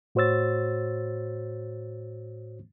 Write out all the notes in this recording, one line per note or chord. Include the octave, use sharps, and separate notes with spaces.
A2 F#4 C5 C#5 E6 A6